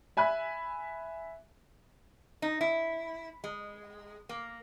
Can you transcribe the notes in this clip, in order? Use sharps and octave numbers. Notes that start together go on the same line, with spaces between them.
E5 G#5 B5 F#6
D#4
E4
G#3
A#3